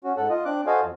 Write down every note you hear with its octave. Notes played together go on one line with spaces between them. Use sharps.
C#4 F#4
G#2 A4 F#5
F4 D#5
C4 D4 D6 F#6
F#4 A4 C5 D#5 F5 G#5
F2